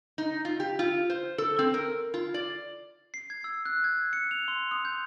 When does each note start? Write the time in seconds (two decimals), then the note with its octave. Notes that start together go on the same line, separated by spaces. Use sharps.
0.18 D#4
0.45 F4
0.60 G4
0.79 F4
1.10 C5
1.38 A4
1.59 C4
1.74 A#4
2.14 F4
2.34 D5
3.14 C7
3.30 G#6
3.44 E6
3.65 F#6
3.84 G#6
4.13 C#7
4.31 F7
4.48 C6
4.71 D#6
4.85 G6